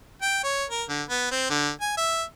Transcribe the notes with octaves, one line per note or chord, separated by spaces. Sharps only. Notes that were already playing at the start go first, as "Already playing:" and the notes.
G5
C#5
A#4
D3
B3
C4
D3
G#5
E5